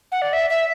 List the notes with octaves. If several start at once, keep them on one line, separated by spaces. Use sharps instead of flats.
F#5
D5
E5
E5